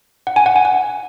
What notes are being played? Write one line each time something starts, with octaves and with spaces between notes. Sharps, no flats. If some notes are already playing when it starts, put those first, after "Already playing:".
F#5
G#5
F#5
G#5
F#5